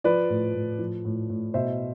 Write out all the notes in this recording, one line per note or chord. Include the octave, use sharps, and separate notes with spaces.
F3 B4 D5
A2
A2
F3
A2
A2
B2 C5 E5